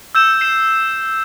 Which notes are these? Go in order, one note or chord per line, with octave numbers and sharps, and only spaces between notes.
E6 G6 E7
C7 E7